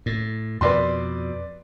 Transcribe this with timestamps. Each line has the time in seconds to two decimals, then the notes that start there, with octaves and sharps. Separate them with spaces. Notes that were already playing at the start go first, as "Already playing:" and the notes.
0.06 A2
0.61 F2 B2 B4 D5 C6